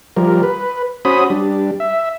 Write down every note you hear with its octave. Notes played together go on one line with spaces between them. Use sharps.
F3 G3 A#4
B4
C#4 F#4 C5 B5 D#6
G3 D4
E5